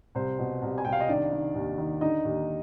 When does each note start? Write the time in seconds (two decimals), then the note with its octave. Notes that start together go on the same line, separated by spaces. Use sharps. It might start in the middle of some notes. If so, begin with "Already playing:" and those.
0.15 C2 C5
0.39 B2
0.62 C2
0.78 G#5
0.85 C2 G5
0.92 F5
1.00 D#5
1.09 D#3 D4 D5
1.32 D#3
1.55 D#2
1.78 D#3
2.01 D3 D#4 D#5
2.25 D#2